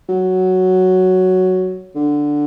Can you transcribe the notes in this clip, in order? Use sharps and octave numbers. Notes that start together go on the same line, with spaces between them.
F#3
D3